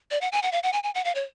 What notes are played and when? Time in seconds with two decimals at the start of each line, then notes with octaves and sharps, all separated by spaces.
0.11 D5
0.21 F#5
0.32 G#5
0.43 F#5
0.52 F5
0.63 F#5
0.73 G#5
0.83 G#5
0.95 F#5
1.05 F5
1.15 C#5